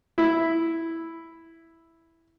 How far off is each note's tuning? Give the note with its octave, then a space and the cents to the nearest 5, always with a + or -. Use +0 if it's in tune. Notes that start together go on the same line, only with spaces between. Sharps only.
E4 +0